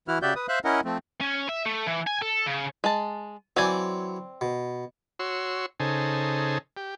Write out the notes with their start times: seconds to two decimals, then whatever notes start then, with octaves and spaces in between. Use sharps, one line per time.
0.08 E3 E4 F#4 F6
0.22 C#3 F#4 G4 D5 E5 G6
0.36 B4 D#6
0.49 C5 E5 F5 F#6
0.65 C#4 E4 A#4 D#5 F#5
0.85 F3 A3 C4
1.21 C#4
1.49 E5
1.66 A3
1.87 E3
2.07 G#5
2.22 A4
2.47 C#3
2.84 G#3 A5
3.56 E3 F#3 C4 D5 G#5
4.41 B2
5.19 F#4 C#5 C6 E6
5.80 C#3 D#4 G#4 A4 C5
6.77 G4